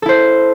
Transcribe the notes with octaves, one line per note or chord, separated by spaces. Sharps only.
E4 A4 C5